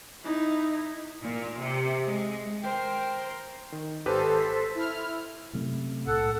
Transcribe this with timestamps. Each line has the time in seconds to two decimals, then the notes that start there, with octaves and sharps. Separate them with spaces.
0.24 D#4 E4
1.22 A#2
1.59 C3
2.07 G#3
2.63 A#4 C5 G5
3.72 D#3
4.06 G#1 G4 A4 B4 C5
4.40 B6
4.75 E4 F6
5.53 F#2 C3 A3
6.07 C2 A2 A4 F#5